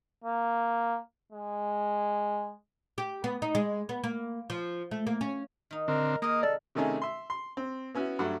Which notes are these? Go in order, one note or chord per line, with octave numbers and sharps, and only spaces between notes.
A#3
G#3
G4
B3
D#4
G#3
B3
A#3
F3
A3
A#3
C#4
D#3 D#4
D3 C4 A#4
G#3 A#3 A#4 D#5 D#6
C3 A4 D5
C3 D#3 A3 C#4 D#4 G#4
E5 C6
C6
C4
B3 C#4 E4 F#4
G2 F#3 A3 F#5